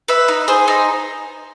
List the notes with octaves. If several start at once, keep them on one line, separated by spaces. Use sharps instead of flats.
B4 E5
D#4
G#4 C5
D#4